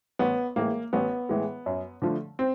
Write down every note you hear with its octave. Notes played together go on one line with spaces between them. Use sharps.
A1 B3
A2 E3 G#3 A#3
A1 B3
A2 E3 G#3
F#2
D3 F3 A3
C4